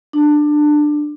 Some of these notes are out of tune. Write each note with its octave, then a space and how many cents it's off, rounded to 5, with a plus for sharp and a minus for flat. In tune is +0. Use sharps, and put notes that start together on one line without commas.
D4 +20